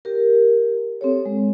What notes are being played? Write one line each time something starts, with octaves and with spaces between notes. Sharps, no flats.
G4 A#4
C4 G4 A4 C#5
G#3